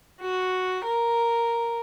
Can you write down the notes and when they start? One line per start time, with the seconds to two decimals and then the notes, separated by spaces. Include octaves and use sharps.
0.20 F#4
0.84 A#4